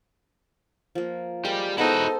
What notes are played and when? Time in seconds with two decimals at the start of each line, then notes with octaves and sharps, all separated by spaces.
0.95 F3 A#3
1.45 G3 G#3 G4 A#4 G5
1.78 B3 D#4 E4 F#4 G#4 A4 C5 A#5